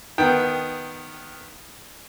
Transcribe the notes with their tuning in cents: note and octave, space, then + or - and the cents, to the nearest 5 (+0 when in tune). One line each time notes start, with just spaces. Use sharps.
D#3 +0 B3 +0 G5 +0